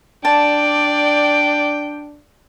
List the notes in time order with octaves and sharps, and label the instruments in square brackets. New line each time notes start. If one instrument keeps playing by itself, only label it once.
[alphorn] D4 [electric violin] D5 [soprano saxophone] G5 [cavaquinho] A5